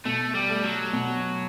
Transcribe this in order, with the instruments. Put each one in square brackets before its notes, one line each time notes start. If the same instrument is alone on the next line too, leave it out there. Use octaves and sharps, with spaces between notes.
[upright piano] B2 [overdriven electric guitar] A3
[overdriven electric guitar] G3
[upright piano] A3
[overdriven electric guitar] F#3
[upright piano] B2